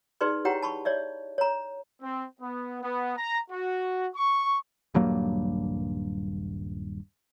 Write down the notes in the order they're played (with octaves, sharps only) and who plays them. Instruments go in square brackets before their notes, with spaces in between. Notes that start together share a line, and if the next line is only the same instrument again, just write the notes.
[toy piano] D#4 G#4 B4 D5 C6
E4 G4 C#5 F#5 G5 A#5
A5 B5 C#6
C#5 D5 E5
C#5 A#5
[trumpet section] C4
B3
B3
A#5
F#4
C#6
[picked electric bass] D#1 G2 F#3 A#3